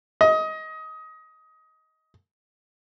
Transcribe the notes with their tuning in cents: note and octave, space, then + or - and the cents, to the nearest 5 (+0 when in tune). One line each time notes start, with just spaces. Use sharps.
D#5 +20